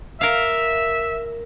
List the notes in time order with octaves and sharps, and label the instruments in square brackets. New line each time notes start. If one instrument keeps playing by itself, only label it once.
[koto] A#4 F5 [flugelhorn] E5